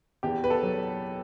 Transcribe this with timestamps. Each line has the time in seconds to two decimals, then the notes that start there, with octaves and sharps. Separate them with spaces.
0.23 E2 G4
0.44 B4
0.50 A4
0.63 F#3